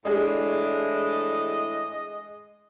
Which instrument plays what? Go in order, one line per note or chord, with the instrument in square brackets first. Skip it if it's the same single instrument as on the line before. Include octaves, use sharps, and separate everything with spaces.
[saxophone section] A2 E3 D4 [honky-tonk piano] G#3 G#4 [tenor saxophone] D#5